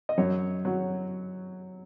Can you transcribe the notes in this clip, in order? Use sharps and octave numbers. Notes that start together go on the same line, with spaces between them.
D#5
F#2 C#5
F#3